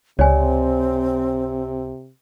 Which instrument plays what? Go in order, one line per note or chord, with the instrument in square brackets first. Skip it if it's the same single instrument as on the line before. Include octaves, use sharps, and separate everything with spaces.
[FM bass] C#2 [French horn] C3 [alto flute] C4 [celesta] C#5 D5 G#5